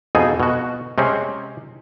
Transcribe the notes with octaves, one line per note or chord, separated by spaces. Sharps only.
F2 B2 D#4 G#4 A4 G#5
B2 F#4
C3 G#3 C4 C#4